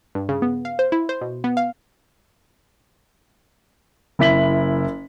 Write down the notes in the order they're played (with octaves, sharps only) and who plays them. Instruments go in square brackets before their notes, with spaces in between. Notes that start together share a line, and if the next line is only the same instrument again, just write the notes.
[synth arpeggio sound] G2
C#3
B3
F5
C5
E4
C5
B2
B3
F5
[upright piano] F#1 E4 B6 F#7